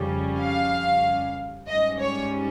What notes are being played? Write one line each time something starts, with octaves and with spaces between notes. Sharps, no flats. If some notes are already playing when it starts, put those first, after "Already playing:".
Already playing: F2 C#3 G3 C#4
F5
G#2 G3 C#4 D#5
C#5